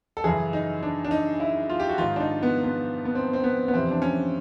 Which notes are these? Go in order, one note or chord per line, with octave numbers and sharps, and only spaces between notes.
A4
F#2 C#3 E3 G#4
D#4
D4
D4
D#4
E4
F4
G4
F#4
G#2 D#3 F4
D4
D#4
B3
B3
B3
C4
C4
B3
B3
F2 C3 E3 C4
D4
C#4